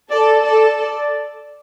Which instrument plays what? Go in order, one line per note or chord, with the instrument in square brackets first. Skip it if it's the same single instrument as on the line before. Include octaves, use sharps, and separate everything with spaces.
[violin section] A4 [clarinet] D5
[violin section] A4 [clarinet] D5
[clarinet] D5